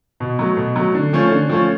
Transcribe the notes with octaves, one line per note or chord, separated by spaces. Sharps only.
B2
F#3 A3
B2
F#3 A3
D3
F3 A3 C#4
D3
F3 A3 C#4